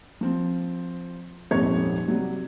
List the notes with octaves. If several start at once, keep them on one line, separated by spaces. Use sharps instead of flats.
F3 C4
D#1 G#1 F2 C4 C#5 G#6
C3 F#3 G3